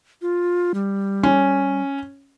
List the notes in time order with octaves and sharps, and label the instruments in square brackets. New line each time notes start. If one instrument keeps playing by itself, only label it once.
[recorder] F4
G3
[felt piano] C#4